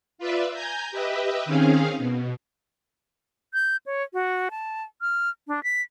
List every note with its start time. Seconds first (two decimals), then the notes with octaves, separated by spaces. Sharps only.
0.18 F4 B4 D5 E5
0.53 G#5 A#5 G6
0.91 G4 B4 D#5 E5
1.46 D#3 C4 C#4 G#4 F5
1.98 B2
3.54 G6
3.86 C#5
4.13 F#4
4.51 A5
5.01 F6
5.48 D4
5.64 B6